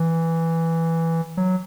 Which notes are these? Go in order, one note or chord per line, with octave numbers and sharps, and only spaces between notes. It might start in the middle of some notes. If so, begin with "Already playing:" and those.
Already playing: E3
F#3